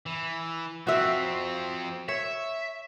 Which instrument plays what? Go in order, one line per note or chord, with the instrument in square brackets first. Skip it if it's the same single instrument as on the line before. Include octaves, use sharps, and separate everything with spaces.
[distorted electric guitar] E3
[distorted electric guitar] F3 C4 [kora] F#4 E5
[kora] C#5 [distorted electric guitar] E5